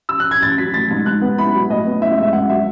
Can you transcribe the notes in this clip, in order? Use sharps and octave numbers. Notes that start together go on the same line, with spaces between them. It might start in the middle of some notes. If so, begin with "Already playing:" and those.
E6
F#6
G#6
A1 A6
F#3 B6
A3 A6
G#2
G#2 F#6
B3
E4 B5
F#3
A2 D#5
B3
E4 E5
E5
G#3
E5
C#2 F#5
F#3 E5